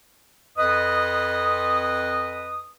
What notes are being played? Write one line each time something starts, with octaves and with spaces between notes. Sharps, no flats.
F2 B4 D#5 D#6